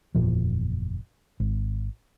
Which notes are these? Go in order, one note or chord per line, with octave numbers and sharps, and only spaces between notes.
F#1 E2 A#2 F3
G#1